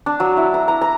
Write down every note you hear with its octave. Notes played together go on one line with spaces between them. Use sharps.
D4
F#3
E4
A#5
A#5
A#5